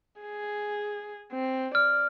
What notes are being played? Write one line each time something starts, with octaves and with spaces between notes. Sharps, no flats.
G#4
C4
D5 F6